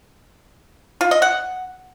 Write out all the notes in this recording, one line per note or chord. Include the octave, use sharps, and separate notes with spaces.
F4
D#5
F#5